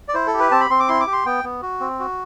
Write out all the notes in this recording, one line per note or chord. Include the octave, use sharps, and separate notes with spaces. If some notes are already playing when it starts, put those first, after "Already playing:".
D5
E4 C5
A4
G4
B4
C4 A5
B5
C4 C6
D6
E4 C6
D6
G4
C6
B3 G5
B3
F#4
C4
F#4